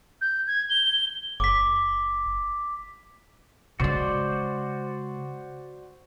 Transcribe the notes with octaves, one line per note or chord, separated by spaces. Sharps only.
G6
G#6
G7
F#1 D6 B6
C#3 G#3 F#4 C5 D5